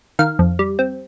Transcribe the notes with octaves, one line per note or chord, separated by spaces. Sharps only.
D#3 F5
F2
G3
C4